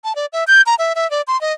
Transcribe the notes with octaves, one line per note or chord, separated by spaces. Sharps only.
A5
D5
E5
G6
A#5
E5
E5
D5
C6
D#5